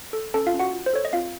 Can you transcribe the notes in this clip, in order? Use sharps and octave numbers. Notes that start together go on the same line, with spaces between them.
A4
C#4 A4 A5
F4 F5
C#4
F#4 F#5
F4
C5
A4 C#5
D#5
C4 F4 F5